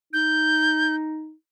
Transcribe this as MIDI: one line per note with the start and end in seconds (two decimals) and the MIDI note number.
0.13 1.34 63
0.13 0.95 91